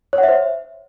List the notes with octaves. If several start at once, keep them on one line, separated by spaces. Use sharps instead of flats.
C#5
F#5
E5
C5